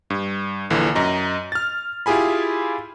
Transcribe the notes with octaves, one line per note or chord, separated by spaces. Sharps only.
G2
A#1 D3 E3
F#2 D#5 A#5
F6 A6
E4 F4 G4 G#4 G#5 B5